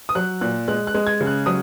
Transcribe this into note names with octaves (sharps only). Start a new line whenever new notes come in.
D#6
F#3 F#6
A#2 F#6
G#3 F#6
F#6
G#3
G#6
C#3
F#6
F#3 D#6